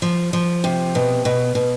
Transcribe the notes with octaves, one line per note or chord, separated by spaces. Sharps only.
F3
F3
C3
B2
B2
B2